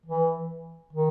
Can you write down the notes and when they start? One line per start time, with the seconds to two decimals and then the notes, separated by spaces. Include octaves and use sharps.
0.06 E3
0.93 D#3